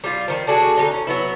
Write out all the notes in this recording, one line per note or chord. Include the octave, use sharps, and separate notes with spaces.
G3 F4
D#3 F3
A3 D4 F#4 G#4
D3 G#3 D#4
C#4
F#3 B3 E4